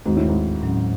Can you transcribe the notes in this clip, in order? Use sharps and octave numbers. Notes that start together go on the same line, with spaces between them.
D#2 G#2 D#3 G#3 C4 F#4
A2
G#2
A2 F#3 C#4